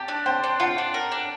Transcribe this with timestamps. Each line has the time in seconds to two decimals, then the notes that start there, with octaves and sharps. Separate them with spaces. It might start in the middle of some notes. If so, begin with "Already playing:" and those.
Already playing: G4 A5
0.08 D4
0.26 C5 G5
0.44 D4
0.60 F4 F#5
0.78 D4
0.94 A#4
1.12 D4